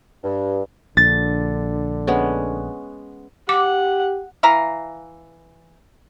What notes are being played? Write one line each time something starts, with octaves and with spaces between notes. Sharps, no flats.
G2
A#1 D3 A6
G#3 B3 C#4
G4 F#5 D6
E3 E5 F5 A#5